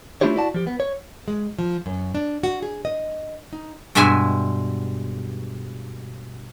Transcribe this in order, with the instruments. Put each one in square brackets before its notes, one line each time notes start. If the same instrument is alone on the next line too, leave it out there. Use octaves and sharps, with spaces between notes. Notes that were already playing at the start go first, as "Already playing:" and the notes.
[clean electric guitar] A3 D4 E4 F4 G4 C#5
E4 F#4 D5 F#5 A5
F3 G4
B3
C#5
[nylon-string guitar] G#3
F3
F#2
D4
F#4
G#4
D#5
D#4
[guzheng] G2 B2 G#3 E5 G#5 C6